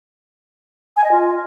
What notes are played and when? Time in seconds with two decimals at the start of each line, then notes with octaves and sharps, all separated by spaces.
0.97 G#5
1.04 D#5
1.11 F4